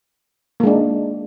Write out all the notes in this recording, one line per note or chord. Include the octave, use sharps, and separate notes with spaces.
G#3 A#3 D4